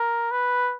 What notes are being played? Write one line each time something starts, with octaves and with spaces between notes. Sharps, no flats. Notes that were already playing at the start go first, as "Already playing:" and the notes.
Already playing: A#4
B4